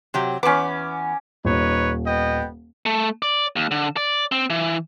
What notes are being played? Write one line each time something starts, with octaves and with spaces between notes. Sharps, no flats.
C3 F#3 G4
E2 B3 C#4 D6
D#1 D#4 B4 C#5
B3 D#5 G5
A3
D5
D#2
D3
D5
C4
E3